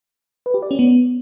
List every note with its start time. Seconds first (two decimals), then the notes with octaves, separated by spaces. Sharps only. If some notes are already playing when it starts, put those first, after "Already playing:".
0.46 B4
0.54 G4
0.62 D5
0.71 C#4
0.79 B3